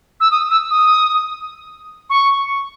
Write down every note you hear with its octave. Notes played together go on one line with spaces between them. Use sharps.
E6
D#6
E6
D#6
C#6